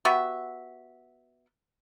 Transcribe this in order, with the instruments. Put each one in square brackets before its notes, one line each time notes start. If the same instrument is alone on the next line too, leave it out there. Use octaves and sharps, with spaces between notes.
[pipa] B3 F#4 G4 E5